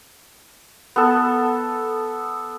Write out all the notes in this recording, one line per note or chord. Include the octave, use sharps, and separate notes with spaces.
B3 A4